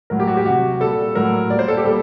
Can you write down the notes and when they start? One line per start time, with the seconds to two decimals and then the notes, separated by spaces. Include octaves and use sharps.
0.10 A2 F#3 A#4
0.20 G4
0.27 F#4
0.37 G4
0.46 C3 F#3 F#4
0.80 A#2 G3 A4
1.15 A2 F#3 A#4
1.50 A#2 G3 D5
1.59 C5
1.68 A4
1.77 G4
1.85 A#2 G3 A4